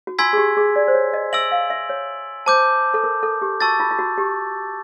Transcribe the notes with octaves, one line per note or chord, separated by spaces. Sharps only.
F#4
F4 G#5 C6 E6 G#6 B6
G#4
G4
G#4
D5
C5
C#5
D#5
E5 E6 A6 D7 F#7
F5
E5
C#5
C5 A5 D6 G6
A4
A#4
A4
G4
F#4 A5 C#6 E6 A6
F4
F4
F#4
G4